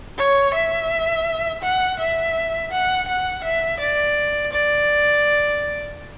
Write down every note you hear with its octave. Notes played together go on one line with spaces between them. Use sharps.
C#5
E5
F#5
E5
F#5
F#5
E5
D5
D5